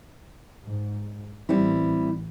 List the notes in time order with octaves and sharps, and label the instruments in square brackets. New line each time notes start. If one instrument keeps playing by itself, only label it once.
[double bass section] G#2
[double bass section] A1 E3 [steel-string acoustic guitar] G3 C4 E4